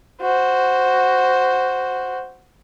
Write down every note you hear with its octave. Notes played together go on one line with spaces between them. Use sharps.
F#4 C5